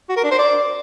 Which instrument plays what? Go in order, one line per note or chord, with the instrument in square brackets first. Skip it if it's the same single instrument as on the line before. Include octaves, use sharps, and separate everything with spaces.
[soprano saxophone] F#4
A#4
D4
C5
D5